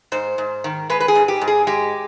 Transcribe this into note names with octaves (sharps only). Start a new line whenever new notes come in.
G#2 C5
G#2
D#3
G#3 B4
B4
G#4
G#2
G4
G#2
G#4
G#3 G4